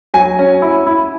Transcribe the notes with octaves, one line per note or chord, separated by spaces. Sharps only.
F#3 G#5
C#4
E4
E4